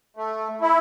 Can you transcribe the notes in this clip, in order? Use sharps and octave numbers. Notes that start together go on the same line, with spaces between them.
A3
E4